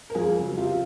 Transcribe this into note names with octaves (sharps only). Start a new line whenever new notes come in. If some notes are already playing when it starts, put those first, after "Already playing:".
A#4
F2 F4 G#4
C#3 F#3
C3 F4